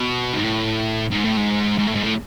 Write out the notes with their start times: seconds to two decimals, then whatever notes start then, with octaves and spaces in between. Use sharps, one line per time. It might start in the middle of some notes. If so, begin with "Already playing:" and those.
Already playing: B2
0.34 G#2
0.44 A2
1.11 G#2
1.24 A2
1.37 G#2
1.78 G#2
1.87 A2
1.95 G#2
2.03 A2